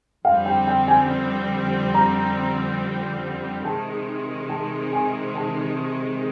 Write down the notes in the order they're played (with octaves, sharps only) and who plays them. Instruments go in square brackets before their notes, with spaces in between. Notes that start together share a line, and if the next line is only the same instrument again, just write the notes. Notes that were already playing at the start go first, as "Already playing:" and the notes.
[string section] F2 D3 G3 C4 [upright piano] F5
[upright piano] G5
G5
G#5
A#5
[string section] C3 D#3 G#3 [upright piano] A5
[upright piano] A5
G#5
A5